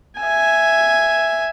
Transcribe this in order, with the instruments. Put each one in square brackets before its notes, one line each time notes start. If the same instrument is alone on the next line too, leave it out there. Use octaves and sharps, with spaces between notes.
[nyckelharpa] E5 G#5